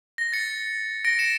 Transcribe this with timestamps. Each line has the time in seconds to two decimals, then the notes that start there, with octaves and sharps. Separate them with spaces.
0.18 A#6
0.32 A6 C#7
1.05 A#6 D7
1.19 C#7 E7